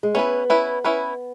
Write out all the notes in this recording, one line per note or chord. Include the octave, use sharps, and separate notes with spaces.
G#3
B3 C#4 E4 B4
C#4 E4 B4
C#4 E4 B4